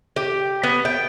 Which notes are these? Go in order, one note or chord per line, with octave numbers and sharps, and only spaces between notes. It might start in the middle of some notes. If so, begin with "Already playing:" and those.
G4
B3
G5